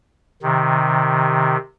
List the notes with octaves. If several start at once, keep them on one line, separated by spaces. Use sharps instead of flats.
C3 D#3